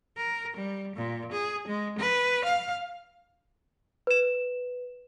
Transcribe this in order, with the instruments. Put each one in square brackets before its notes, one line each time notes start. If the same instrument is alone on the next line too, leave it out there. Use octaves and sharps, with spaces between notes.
[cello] A#4
G3
A#2
G#4
G#3
B4
F5
[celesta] B4 E7